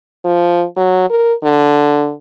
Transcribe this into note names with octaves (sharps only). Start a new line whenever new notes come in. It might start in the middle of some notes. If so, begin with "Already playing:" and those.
F3
F#3
A#4
D3